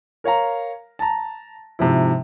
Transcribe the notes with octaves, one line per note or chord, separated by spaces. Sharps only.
A#4 C#5 F5 A#5
A5 A#5
G#2 C3 F3 E4